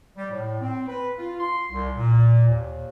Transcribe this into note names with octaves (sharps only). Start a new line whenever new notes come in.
G3
A2
C4
B4
F4
C6
C2
A#2
D#2